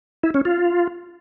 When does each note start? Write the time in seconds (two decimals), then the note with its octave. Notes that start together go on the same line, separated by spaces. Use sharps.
0.23 E4
0.34 C#4
0.45 F4